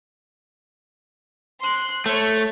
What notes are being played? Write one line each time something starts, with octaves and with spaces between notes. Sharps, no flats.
C6 F#6
A3 C#5